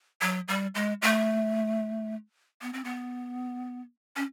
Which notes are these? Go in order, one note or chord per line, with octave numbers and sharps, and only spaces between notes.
F#3
G3
G#3
A3
B3
C4
B3
C#4